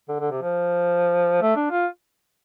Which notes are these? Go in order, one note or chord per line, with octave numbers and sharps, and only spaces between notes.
D3
D3
C3
F3
A3
D4
F4